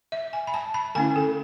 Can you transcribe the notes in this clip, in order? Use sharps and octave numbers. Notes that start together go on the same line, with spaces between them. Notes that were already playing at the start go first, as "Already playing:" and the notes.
E5
G#5
B5
A5
B5
D3 A3 C#4 E4 G#5
A4